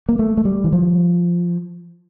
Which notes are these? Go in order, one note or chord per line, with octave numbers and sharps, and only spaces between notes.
A#3
A3
A3
G3
E3
F3